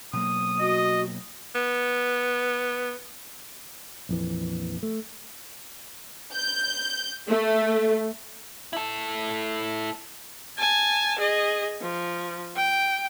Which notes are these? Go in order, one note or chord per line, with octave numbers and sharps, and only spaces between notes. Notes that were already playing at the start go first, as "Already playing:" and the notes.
B2 F#3 A#3 D#6
F#4 D#5
B3
A#1 F2 E3
A3
G6
A3
E4 A4
G#5 A5
G#4 D#5
F3
G5